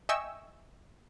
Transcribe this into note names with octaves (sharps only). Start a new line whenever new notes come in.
D#5 E5 G5 G#5 C#6 E6